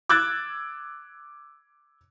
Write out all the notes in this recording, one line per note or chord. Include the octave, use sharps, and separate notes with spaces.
D6 E6 F#6 G#6 A6